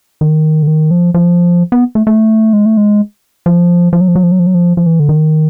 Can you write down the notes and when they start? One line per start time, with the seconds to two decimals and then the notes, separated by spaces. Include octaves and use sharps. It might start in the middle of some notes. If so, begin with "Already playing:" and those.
0.21 D#3
0.63 D3
0.67 D#3
0.91 F3
1.14 F3
1.72 B3
1.95 A3
2.07 A3
2.53 G#3
2.66 A3
2.77 G#3
3.46 F3
3.93 F3
4.00 F#3
4.08 F3
4.15 F#3
4.23 F3
4.31 F#3
4.39 F3
4.47 F#3
4.54 F3
4.77 F3
4.86 E3
5.00 D3
5.09 D#3